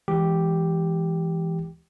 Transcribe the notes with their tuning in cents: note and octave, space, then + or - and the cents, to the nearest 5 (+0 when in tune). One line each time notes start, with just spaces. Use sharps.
E3 +10 G#3 +0 G4 +0